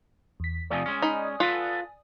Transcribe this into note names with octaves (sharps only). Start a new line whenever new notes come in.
E2 B6
C3 F3 A3 D5 G#5 D#6
G#3 C#4
D#4 B5
F4 A4 B4 F#5